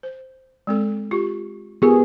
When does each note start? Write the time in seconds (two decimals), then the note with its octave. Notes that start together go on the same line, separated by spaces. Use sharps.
0.03 C5
0.67 G#3 C4 A4
1.11 F4 G4
1.82 B3 F4 G4 G#4 A#4